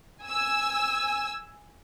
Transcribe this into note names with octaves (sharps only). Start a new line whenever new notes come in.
G#5 E6